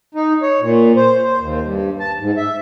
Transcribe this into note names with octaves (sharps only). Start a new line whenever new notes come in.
D#4
C#5
A#2
C5
C5
D#2
G2
A5
G#2
E5